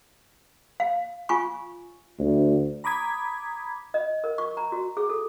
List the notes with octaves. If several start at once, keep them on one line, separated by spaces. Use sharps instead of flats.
F5
F4 G#5 C#6
D2
A#5 B5 D6 D#6 G#6 B6
D#5
A#4
C#6
A#5
F#4
G#4
A4